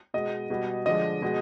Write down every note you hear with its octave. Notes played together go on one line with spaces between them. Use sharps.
B2 G#3 D#5
B2 G3
D3 F3 G#3 D#5
B2 G#3